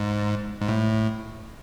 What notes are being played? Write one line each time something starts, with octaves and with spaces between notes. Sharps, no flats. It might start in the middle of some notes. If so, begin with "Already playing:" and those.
Already playing: G#2
G#2
A2